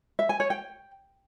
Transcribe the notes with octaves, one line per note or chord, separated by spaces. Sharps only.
E5
G#5
C#5
G5